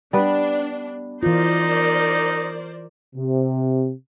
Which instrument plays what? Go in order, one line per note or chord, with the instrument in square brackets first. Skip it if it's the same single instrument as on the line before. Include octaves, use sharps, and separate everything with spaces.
[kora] G3 B3 B4 [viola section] D4
[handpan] E3 F4 [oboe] D#4 [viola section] A#4 C5 D5
[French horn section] C3